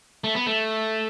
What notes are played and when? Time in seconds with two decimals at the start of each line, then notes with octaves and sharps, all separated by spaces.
0.24 A3
0.35 B3
0.47 A3